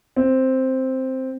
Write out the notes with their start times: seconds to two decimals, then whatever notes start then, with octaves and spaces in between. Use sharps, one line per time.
0.16 C4